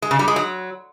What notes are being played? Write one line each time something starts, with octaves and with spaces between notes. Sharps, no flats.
G#3
C#3
G3
G#3
F#3